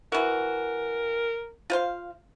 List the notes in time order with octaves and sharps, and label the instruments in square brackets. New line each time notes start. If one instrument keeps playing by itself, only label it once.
[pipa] E3 F#4 [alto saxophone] A#4
[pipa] F4 C5 F5